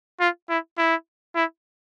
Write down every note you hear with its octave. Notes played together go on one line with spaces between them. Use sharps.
F4
E4
E4
E4